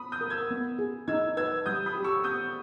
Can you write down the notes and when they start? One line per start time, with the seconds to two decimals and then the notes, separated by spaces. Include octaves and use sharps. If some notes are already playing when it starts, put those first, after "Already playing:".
Already playing: B3 B5 D#6
0.12 D#6 G6
0.21 A#4
0.30 E6 G#6
0.51 B3
0.79 G#4
1.08 D#4 E6 G#6
1.37 B4 E6 G#6
1.66 G3 D#6 G6
1.86 B5 D#6
1.95 G4
2.04 C#6 E6
2.24 B3 D#6 G6